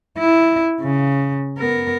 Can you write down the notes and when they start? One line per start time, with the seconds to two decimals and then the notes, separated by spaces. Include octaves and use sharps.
0.18 E4
0.81 C#3
1.59 B3 A#4